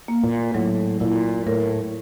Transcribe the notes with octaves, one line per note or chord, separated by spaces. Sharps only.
A#3
A#2
A2 F#3
A#2 E4
A2 A#4